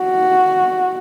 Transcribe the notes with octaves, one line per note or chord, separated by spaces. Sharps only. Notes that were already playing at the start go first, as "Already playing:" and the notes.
Already playing: F#4